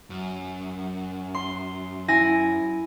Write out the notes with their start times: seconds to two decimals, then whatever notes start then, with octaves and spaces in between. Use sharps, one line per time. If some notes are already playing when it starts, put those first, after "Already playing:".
0.10 F#2
1.34 C6
2.08 E4 G#5 A#6